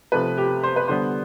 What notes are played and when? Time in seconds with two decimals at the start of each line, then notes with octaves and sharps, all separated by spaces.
0.12 C3 F3 A3 B4
0.37 G4
0.63 C5
0.76 B4
0.88 D3 G3 B3 C5